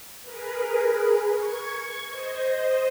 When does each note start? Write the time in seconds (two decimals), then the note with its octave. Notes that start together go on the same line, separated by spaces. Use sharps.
0.22 G#4 A#4 B4
1.30 C#6 G#6
2.08 C5 D#5